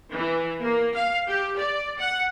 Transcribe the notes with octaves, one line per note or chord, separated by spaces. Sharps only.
E3
A#3
F5
G4
D5
F#5